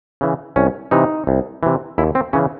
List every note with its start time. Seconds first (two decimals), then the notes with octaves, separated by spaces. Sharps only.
0.21 C#3 E3
0.56 C2 C#4
0.91 C3 E3 D#4
1.27 C2
1.63 C3 E3
1.98 D#2 E4
2.15 C4
2.33 C#3 E3 C#4